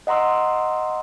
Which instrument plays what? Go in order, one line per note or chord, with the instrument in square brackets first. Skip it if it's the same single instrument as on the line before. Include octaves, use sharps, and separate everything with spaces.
[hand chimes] D#5 F#5 A#5 C6 E6